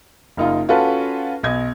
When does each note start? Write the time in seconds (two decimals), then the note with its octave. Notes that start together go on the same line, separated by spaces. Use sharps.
0.37 F#1 D#4 F4
0.69 C#4 F4 F#4 A4 B4 A5
1.43 B1 D#5 G#6